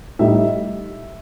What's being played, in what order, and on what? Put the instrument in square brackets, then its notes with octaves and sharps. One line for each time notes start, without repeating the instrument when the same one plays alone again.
[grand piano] A2 G3 D#4 E5